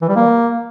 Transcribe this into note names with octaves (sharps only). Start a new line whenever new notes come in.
E3
G3
A#3